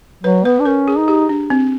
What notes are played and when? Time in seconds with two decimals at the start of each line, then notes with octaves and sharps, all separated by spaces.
0.23 F#3 B4
0.45 B3 B4
0.60 D4
0.65 C#4 A#4
0.88 G#4
0.98 D#4
1.08 G4
1.29 D4
1.50 C4